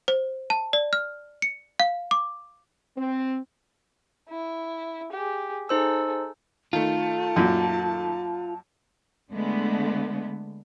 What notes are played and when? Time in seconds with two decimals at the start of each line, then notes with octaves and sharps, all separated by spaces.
0.08 C5
0.50 A5
0.73 D5
0.93 F6
1.42 C#7
1.80 F5
2.11 D6
2.97 C4
4.29 E4
5.12 G4 G#4
5.69 D#4 G#4 A4 C5 E6
6.73 D#3 A3 F4 A5
7.36 F#2 A#2
9.32 D3 G#3 A3 B3